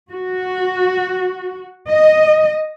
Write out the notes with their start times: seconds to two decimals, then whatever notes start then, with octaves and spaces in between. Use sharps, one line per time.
0.12 F#4
1.90 D#5